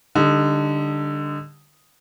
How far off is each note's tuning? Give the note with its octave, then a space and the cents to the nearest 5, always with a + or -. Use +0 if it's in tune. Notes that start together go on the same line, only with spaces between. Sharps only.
D3 +0 G3 +25 D#4 -5